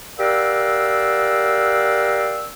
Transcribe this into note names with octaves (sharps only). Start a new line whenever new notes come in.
G4 A#4 D5 F5 F#5 E6